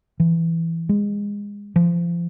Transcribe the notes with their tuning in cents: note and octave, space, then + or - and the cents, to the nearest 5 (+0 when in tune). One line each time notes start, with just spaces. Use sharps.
E3 +10
G#3 -25
F3 -30